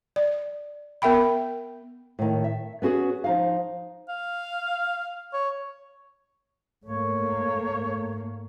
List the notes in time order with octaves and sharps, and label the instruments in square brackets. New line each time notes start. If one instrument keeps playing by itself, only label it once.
[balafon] D5
B3 A#4 E5 G5 B5
[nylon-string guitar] A2 D#3
E5
B3 C#4 F#4 G#4
F3 D#4 F5
[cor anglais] F5
C#5
[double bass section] G#2 A3 A#3 [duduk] C#5